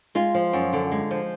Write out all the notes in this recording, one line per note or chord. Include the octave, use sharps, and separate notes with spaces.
G#3 F4
F3
F#2
D3
G#3
F3